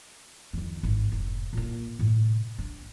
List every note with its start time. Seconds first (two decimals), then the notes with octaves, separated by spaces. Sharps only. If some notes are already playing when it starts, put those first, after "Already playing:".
0.53 F2 D#3
0.83 G#1
1.12 F1
1.53 A#2 A#3
1.99 A2 C3
2.58 D4